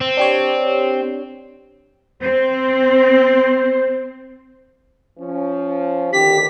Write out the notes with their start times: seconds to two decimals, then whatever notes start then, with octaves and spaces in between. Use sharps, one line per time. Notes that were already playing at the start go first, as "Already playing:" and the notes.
0.01 C4
0.17 D4 G4 C#5
2.22 C4 C5
5.19 F3 C#4
6.13 D2 D3 D#3 G4 B6